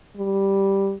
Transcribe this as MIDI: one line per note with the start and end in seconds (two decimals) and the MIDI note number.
0.17 0.94 55